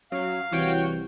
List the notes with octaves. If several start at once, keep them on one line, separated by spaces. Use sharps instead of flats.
F#2 F#3 F5
C2 E3 F#4 C#5 G5